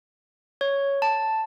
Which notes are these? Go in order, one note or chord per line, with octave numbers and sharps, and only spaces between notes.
C#5
A5